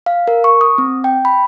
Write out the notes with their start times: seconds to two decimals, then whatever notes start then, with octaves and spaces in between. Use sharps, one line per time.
0.06 F5
0.28 A#4
0.44 C#6
0.61 D#6
0.78 C4
1.04 G5
1.25 B5